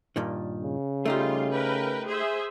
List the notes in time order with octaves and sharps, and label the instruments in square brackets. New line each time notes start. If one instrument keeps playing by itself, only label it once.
[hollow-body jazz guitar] G2 A#2 D#3
[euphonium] C#3
[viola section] G3 F4 C6 [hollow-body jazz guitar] A3 D#4 G4
[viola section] A#4 B4 G5
G#4 C5 E5